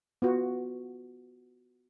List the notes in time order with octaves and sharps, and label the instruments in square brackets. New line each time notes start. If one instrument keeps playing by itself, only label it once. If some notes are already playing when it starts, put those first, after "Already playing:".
[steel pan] B3 F4 F#4